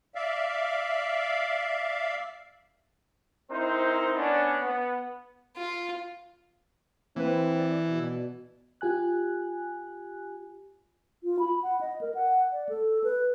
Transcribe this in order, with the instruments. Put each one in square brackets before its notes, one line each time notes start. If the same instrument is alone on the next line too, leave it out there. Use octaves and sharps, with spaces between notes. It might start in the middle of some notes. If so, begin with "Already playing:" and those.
[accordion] D5 E5 F5
[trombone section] C4 D#4 E4 A#4 C5
B3 C#4 D4
B3
[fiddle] F4
[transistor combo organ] E3 [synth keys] A#3 B4 [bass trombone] C4
[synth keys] D5
[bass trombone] B2
[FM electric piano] F4 G4 G#5 F#6
[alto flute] F4
B5
F#5
D#5
A#4
F#5
D5
A4
B4